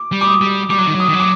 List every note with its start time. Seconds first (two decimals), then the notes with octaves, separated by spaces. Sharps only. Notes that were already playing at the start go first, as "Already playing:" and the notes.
Already playing: D6
0.12 G3
0.21 D6
0.27 D#6
0.41 G3
0.70 G3 D6
0.79 F#3
0.87 D#3
0.95 F#3
1.00 D#6
1.09 D#3
1.14 F#3
1.20 D6